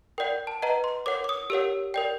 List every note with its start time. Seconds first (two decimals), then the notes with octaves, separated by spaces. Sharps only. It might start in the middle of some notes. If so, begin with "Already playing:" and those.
0.18 A#4 D5 F#5 G5
0.47 A5
0.62 B4 D#5 F#5 A#5
0.84 C6
1.06 A#4 C#5 F#5 D6
1.24 D6
1.29 D#6
1.50 G4 A#4 C#5 F#5 E6
1.94 A#4 D5 G5